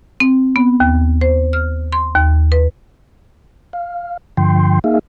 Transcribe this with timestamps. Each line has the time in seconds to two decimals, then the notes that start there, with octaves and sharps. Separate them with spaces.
0.20 C4
0.56 B3
0.80 D#2
1.21 C5
1.53 F6
1.92 C6
2.15 D#2
2.52 B4
3.73 F5
4.37 G2 D3 F3 G5 C6
4.84 A#3 D#4 G#4 E5 F5